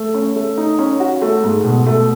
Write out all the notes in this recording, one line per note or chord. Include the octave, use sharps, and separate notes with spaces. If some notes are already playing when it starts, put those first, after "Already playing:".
Already playing: A3
C#4
A3
D#4
C#4
F#4
A3
G#2
B2
A3